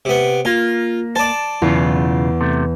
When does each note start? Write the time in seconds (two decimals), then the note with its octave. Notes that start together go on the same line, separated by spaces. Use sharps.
0.05 C3 B3
0.45 A#3 F4
1.16 C5 D5 A5
1.62 B1 E2 C#3 F4
2.41 C3 A3